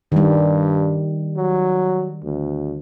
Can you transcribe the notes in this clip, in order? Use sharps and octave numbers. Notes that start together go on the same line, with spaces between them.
G2 D#3 G3
F#3
D2